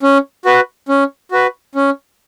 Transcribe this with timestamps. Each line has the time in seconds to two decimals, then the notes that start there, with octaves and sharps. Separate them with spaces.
0.03 C#4
0.45 F#4 B4
0.89 C#4
1.32 F#4 B4
1.75 C#4